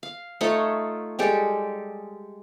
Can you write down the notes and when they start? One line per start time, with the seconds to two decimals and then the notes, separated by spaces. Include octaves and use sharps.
0.03 F5
0.41 A3 D#4 F4 C#5
1.19 G3 G#3 G4 A4